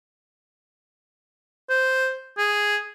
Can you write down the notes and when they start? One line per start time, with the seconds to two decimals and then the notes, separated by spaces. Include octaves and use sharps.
1.70 C5
2.38 G#4